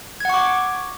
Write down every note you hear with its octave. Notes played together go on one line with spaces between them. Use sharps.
F#5 C#6 D6 G#6